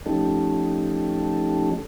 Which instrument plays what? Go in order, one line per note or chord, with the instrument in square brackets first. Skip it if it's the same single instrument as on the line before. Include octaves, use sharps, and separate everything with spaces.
[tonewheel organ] F3 A3 C#4 D#4 G4 A4